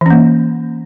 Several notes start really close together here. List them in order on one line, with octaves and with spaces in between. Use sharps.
E3 C#4 A#3